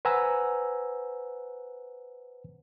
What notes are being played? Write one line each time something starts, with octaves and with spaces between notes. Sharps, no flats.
B4 C5 F#5 G#5 A#5 E6